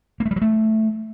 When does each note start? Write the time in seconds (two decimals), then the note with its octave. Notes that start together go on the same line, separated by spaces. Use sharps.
0.20 A#3
0.26 A3
0.31 G3
0.36 F#3
0.42 A3